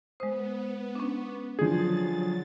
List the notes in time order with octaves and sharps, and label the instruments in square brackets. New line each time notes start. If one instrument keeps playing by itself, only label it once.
[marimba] G#3 C5 [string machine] B3 [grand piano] D#6
[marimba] C#4 D4
[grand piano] D3 F3 [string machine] F#3 A6 [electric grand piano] G#4